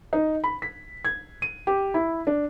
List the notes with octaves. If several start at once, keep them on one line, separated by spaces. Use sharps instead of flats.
D#4
B5
B6
G#6
D#7
G4
E4
D4